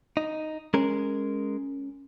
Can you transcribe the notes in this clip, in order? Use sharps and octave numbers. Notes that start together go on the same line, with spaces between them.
D#4
G#3 C#4 A#4